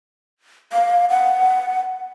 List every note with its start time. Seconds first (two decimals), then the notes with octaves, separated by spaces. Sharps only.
0.73 F5
1.10 F#5